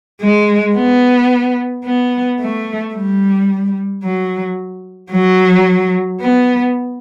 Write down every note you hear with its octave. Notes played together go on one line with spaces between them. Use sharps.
G#3
B3
B3
A3
G3
F#3
F#3
B3